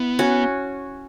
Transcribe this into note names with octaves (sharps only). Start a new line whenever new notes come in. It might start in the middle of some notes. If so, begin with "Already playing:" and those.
Already playing: B3 E4
C#4 F#4